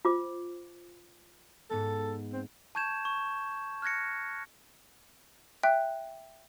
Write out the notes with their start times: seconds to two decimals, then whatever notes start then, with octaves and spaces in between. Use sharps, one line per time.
0.05 F4 C5 D6
1.70 G#2 B3 A4
2.33 C4
2.75 A5 C#6 G6 G#6 E7
3.05 C#6
3.82 F6 F#6 G#6 A#6 C#7
5.63 E5 G5 F#6